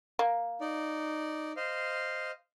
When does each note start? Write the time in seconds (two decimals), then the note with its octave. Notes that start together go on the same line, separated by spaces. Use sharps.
0.19 A#3
0.61 D#4 D5
1.57 C5 D#5 F5